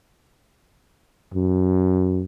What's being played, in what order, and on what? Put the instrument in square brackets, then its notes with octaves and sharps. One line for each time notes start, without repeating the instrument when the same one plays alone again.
[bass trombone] F#2